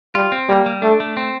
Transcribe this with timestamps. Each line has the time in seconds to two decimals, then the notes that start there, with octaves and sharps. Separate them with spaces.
0.15 G3 F4
0.32 C4
0.49 G3 A#3
0.66 G3
0.82 A3 D4
1.00 A3
1.17 C4